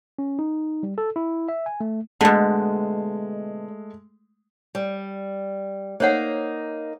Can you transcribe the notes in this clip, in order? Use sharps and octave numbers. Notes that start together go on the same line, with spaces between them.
C#4
D#4
G3
A4
E4
E5
G#5
A3
B2 D3 G#3 A3
G3
A#3 D#4 C5 C#5 F#5